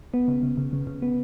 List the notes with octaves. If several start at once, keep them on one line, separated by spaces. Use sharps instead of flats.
B3
C#3
C#3
C#3
C#3
C#3
B3